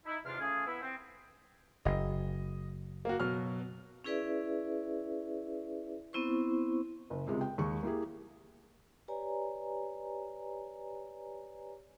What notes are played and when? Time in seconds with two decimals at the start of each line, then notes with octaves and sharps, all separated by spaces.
0.05 D#4 E4
0.24 E2 G#2 C3 D4 F4 F6
0.40 C#3 A3 C#4 F4 G#4
0.66 B3 E4 E5
0.82 C4
1.85 F#1 D#5
3.05 A#3 F#4
3.20 B2 F#3 F6
4.04 C#4 E4 G#4 B4 D5 E5
6.13 B3 C4 E4 C5 C#6
7.10 F#1
7.27 C#2 C3 G#3
7.41 G5
7.58 D#2 G#3 C#6
7.83 A#3 E4 G4 G#4
9.08 G4 B4 C#5 D5 G#5 A#5